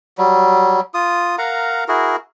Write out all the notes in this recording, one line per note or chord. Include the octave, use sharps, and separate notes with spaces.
F#3 G3
F4 D#6
A#4 F5 F#5 A#5
E4 F#4 G#4 A#4